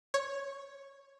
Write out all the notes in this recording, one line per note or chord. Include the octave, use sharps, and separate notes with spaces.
C#5